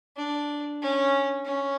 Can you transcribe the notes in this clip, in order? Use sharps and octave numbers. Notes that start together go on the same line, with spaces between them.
D4
C#4
C#4